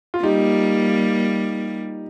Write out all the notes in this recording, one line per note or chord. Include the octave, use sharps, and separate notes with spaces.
F4
G3 A#3 D#4 G4